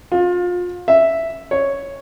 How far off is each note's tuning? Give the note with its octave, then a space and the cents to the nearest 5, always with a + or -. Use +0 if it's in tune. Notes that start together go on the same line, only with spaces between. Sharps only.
F4 +30
E5 +0
C#5 +0